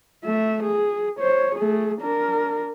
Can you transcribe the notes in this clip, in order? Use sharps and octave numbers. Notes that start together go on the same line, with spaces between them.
A3 E5
G#4
C5 C#5
A3 G#4
D4 A#4